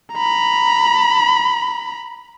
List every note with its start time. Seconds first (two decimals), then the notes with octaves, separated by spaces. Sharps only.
0.14 A#5 B5